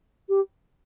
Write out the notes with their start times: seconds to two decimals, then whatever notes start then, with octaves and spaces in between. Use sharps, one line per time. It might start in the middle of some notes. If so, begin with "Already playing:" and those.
0.29 G4